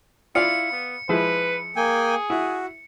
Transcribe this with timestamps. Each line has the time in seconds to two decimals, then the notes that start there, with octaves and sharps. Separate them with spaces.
0.35 E4 F4 D5 F5 C#7
0.72 B3
1.09 F3 G#3 E4 B4
1.76 A#3 G#4 G5 G#5
2.30 E4 F#4